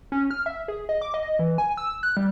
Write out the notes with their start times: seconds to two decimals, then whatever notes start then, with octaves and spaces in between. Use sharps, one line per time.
0.12 C#4
0.31 F6
0.46 E5
0.68 G#4
0.89 D#5
1.01 D6
1.14 D#5
1.39 E3
1.58 G#5
1.77 E6
2.03 F#6
2.17 G3